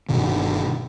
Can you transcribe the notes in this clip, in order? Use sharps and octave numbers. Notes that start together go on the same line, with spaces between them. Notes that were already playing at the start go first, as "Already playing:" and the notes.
G1 G2 B2 D#3